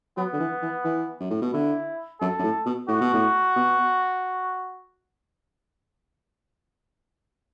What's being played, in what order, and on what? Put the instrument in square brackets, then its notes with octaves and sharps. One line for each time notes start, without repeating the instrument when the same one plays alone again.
[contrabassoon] F#3 [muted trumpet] B3
[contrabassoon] D3
E3
E3
E3
F#2
A2
B2
[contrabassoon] D3 [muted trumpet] E4
[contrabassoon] F#2 [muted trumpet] A4
[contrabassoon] F#2
A2
B2
[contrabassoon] A2 [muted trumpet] F#4
[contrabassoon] B2
A2
B2